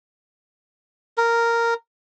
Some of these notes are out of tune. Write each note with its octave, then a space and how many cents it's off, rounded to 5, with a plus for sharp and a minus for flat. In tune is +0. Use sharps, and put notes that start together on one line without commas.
A#4 -5